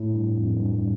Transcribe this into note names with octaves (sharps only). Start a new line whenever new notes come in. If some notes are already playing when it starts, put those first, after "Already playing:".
Already playing: A2
G2
F2
G2